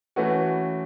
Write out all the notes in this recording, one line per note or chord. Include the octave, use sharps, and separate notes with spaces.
E3 A3 C#4 F#4 B4